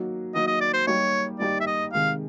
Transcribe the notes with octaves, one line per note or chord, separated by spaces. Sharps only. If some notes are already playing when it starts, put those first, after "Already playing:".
Already playing: F#3 A#3 D#4 F#4
F#3 A#3 D#4 F#4 D#5
D#5
D5
C5
G3 A#3 D#4 G4 C#5
G3 A#3 D#4 G4 D5
E5
D#5
C3 D#3 G#3 F5